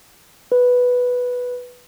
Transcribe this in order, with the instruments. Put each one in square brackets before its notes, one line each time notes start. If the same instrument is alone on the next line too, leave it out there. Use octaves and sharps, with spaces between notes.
[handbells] B4